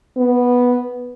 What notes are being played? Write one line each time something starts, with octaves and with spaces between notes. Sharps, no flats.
B3